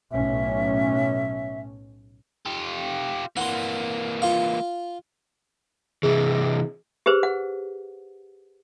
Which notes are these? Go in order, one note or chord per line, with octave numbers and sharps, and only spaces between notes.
B1 A2 C#4 E5
F4 G4
E3 A#3 F#5 C6
F4 F5
C3 E3 G#4
G4 G#4 B4 C5
F#5